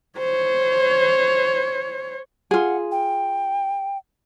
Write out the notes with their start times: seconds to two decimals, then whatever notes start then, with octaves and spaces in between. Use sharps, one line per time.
0.18 C5 C#5
2.51 F4 G#4 F#5
2.91 G5